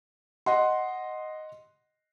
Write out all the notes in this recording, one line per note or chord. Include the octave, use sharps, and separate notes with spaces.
D#5 F#5 C6